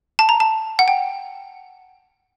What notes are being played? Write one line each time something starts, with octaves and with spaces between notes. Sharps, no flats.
A5
A#5
A5
F#5
G5